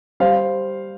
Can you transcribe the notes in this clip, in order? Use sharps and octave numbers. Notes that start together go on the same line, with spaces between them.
G3 C5 F5